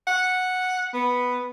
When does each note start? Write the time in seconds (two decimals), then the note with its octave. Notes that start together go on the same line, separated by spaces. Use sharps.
0.07 F#5
0.94 B3